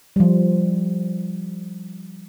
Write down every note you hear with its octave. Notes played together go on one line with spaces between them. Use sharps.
F3 G3